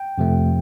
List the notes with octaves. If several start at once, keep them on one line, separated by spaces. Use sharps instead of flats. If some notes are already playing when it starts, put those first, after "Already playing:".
Already playing: G5
F2 C3 F3 A3